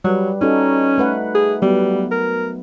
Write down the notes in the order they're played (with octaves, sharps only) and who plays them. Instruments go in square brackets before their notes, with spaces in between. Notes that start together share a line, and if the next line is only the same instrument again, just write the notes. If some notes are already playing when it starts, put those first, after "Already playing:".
[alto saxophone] F#3 [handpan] G3 B4
[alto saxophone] C#4 [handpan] D#4 F#4 A4
[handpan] A3 B4 F#5
[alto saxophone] G#4
[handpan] F#3 B3 [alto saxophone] G3
[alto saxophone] A#4